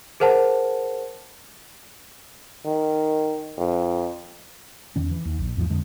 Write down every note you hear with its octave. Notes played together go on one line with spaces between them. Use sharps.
G#4 A#4 C5 F#5 A5
D#3
F2
E2 D#3 C#4
E3
D#2
A#1
E2 G#2 C#3 F3
F2 D3 G#3